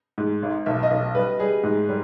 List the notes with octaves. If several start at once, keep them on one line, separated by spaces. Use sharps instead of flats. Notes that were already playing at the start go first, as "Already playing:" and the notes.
G#2
G#1
B1 E5
D#5
B1
G3 B4
G3 G#4
G#2
G3